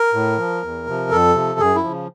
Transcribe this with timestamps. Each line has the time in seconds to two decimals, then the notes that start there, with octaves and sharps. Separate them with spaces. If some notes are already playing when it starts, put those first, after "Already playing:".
Already playing: A#4
0.14 A2
0.38 F3
0.63 E2
0.87 C3 F3
1.11 F2 A4
1.35 C3 F3
1.59 F#2 G#4
1.75 E4
1.84 C#3 F3